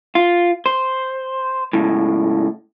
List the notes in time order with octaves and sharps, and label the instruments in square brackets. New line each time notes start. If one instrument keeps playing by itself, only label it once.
[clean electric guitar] F4
C5
C#2 A2